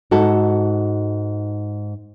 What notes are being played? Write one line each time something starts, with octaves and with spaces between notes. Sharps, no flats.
G#2 D#4 F#4 A4